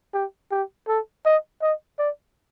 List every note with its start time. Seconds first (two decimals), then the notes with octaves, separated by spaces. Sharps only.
0.14 G4
0.51 G4
0.88 A4
1.25 D#5
1.62 D#5
1.98 D5